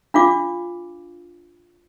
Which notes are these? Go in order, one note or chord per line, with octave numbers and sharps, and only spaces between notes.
D4 F4 F5 D6